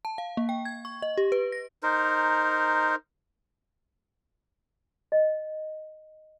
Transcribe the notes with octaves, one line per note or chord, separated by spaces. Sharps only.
A5
F5
A#3
G5
G#6
C#6
D#5
G4
B4
A#6
D#4 A#4 C5
D#5